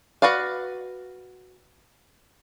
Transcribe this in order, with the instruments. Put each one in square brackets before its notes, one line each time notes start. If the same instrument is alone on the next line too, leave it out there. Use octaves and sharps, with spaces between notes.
[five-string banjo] F#4 B4 D5 F5